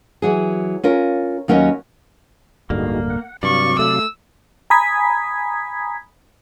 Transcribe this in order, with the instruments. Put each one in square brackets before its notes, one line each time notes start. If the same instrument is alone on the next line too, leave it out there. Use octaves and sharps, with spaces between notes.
[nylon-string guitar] E3 F#3 G#4
C#4 F4 A#4
D#2 F#3 C#4 A#4 D#5
[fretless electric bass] D1 G2 D3 [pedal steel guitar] A#3 [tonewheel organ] D#4 F#4 G#4
[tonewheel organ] F#5
[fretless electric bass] G2 [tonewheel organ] C3 F#3 F5 [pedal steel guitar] D5 [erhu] C#6
[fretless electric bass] A3 [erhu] E6
[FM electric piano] G#5 A#5 B5 D#6 G#6 B6